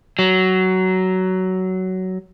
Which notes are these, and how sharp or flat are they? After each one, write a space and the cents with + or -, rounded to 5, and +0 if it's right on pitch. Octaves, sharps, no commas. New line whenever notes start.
F#3 +15